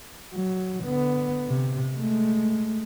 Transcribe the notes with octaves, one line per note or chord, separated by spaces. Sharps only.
F#3
D3 B3
C3
G#3 A3